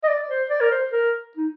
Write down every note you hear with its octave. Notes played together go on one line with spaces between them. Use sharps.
D#5
D5
C5
D5
A#4
C5
A#4
D#4